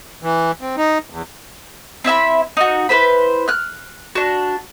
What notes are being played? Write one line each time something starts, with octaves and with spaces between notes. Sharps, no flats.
E3
C4
D#4
E2
C4 E4 E5 B5
D#4 F#4
E4 B4 C5 B5
F6 F#6
D4 F#4